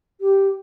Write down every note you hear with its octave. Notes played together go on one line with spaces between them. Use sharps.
G4